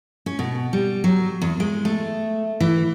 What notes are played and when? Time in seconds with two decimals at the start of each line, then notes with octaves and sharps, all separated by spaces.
0.26 C#4
0.39 B2
0.73 G3
1.04 F#3
1.42 E2
1.60 G#3
1.85 A3
2.60 E3